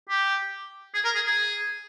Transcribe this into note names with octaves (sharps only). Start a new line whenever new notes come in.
G4
G#4
A#4
G#4
G#4